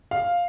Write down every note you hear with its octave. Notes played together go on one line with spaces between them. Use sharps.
F5